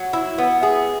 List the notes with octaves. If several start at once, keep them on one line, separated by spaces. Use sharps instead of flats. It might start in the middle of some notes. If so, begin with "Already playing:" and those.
Already playing: F#3
E4
B3
G#4